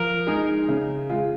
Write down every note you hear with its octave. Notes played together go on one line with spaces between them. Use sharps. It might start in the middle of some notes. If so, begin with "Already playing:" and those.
Already playing: F3 A#4
G#3 D#4 G#4
C#3
G#3 F4